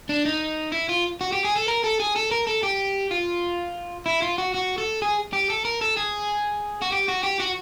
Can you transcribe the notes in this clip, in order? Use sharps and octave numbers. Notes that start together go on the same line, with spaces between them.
D4
D#4
E4
F4
F#4
G4
G#4
A4
A#4
A4
G#4
A4
A#4
A4
G4
F4
E4
F4
F#4
F#4
A4
G#4
G4
A4
A#4
A4
G#4
F#4
G4
F#4
G4
F#4